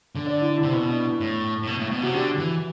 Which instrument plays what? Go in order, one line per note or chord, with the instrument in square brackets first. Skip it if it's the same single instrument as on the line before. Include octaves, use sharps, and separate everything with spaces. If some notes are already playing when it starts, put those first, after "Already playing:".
[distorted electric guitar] D3
[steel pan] D5
E4
E4
[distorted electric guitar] C3
[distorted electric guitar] B2 [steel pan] E4
[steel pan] D4
E4
[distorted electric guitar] A2
A2
B2
A2
B2
[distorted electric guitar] C3 [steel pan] F#4
[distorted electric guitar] D3 [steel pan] G4
[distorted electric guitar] E3